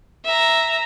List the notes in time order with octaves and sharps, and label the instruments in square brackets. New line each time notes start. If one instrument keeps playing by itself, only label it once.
[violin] E5 A#5